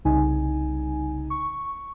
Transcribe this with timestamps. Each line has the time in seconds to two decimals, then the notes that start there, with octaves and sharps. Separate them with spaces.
0.05 C2 C#3 D#4 G#5
1.30 C#6